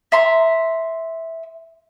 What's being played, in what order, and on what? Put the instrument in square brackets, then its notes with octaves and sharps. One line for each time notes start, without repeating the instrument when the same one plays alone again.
[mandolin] E5 A#5 C6